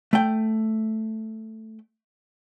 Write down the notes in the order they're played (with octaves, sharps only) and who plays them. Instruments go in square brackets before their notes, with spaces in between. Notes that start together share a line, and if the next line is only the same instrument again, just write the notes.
[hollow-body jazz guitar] A3 G5